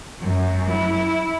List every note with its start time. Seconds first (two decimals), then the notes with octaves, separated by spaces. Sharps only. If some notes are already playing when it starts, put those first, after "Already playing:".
0.22 F#2
0.70 E4